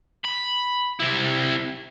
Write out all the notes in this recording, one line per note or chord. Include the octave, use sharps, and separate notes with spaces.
B5
C3 E4